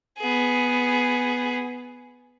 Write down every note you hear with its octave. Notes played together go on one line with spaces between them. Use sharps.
B3 G#4